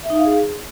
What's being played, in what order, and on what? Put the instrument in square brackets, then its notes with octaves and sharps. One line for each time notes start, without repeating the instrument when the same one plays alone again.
[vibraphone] E5
D#4
F5
G#4